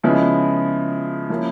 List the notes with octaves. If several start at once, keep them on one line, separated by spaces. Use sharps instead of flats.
C#3 F3 G#3 B3 E4
F3 A#3 C#4 E4